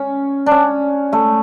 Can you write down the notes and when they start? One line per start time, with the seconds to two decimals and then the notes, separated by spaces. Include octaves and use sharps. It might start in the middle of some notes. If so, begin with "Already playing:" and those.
Already playing: C#4
0.46 C#4 D4
1.12 A3